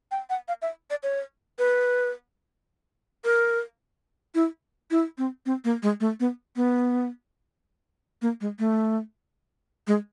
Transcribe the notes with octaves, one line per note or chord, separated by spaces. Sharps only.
G5
F#5
F5
E5
D5
C#5
B4
A#4
E4
E4
C4
C4
A#3
G#3
A3
B3
B3
A#3
G#3
A3
G#3